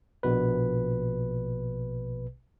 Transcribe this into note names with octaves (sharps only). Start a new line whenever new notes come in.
A#1 B2 B4